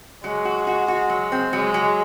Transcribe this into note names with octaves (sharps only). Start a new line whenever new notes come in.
F#3 G#3
F#4
F#4
F#4
F#3
C4
F#3 G#3
F#3